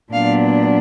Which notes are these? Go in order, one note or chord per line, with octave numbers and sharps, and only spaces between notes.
A#2 F#3 B3 D4 F5